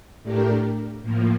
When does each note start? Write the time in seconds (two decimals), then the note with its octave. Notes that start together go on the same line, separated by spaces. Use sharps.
0.23 A2 A3 D4 G4 A#4
1.02 A2 F3 A#3